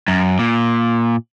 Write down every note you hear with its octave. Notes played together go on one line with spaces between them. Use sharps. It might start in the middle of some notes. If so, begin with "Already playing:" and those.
F#2
A#2